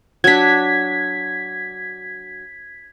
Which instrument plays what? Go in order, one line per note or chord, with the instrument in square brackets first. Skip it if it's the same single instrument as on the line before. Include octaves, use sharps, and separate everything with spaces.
[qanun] F#3 D4 [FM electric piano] G#6 B6